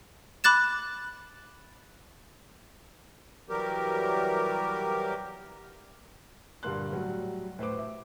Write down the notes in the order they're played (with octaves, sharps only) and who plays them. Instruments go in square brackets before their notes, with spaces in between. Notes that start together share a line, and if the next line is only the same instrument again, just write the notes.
[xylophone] B5 D6 F#6 A6 E7
[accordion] E3 F#3 G3 G4 A#4
[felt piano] G2 A#2 D3 A#3 C6 F#6
A2 F#3 G3
A2 B4 C5 D6
E5